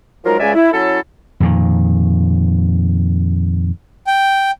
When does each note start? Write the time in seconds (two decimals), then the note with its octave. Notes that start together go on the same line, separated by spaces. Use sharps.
0.24 F3 F#3 G#3 D#4 F4 A#4
0.40 C#2 C#3 G#3 D5 E5 G#5
0.54 E4
0.72 F#3 C#4 E4 A4
1.40 F2 A#2 D#3
4.07 G5